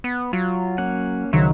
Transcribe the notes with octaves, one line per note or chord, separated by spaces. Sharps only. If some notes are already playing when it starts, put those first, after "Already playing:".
B3
F#3 F4
A#3 C#4 F#5
C#2 D#3 F#3 C5 C#5 E5